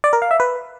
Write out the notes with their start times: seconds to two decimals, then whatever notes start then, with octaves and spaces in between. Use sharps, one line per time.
0.04 D5
0.13 A#4
0.22 F5
0.31 E5
0.40 B4